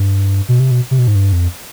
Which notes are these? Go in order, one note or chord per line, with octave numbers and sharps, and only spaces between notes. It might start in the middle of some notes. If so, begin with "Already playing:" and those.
Already playing: G2
B2
C3
B2
C3
B2
G#2
G2
F2